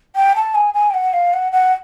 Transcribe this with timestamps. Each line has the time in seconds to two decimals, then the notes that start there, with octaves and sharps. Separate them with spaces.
0.15 G5
0.35 A5
0.54 G#5
0.74 G#5
0.90 G5
0.94 F#5
1.13 F5
1.33 F#5
1.52 F#5